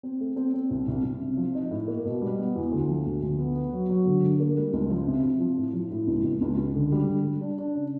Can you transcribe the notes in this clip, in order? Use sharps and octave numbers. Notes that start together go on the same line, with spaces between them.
C4
A3
C4
C4
C2
C2
C2
C3
F3
D#4
A2
A#3
B2
G3
B3
E2
D2
F3
D2
D2
B3
B3
F#3
F#3
D3
D3
A#3
G3
C#2
F3
C3
C3
F3
A2
F3
A2
C#2
C#2
C#2
C#2
D3
G3
D3
G3
D4
D4
C#3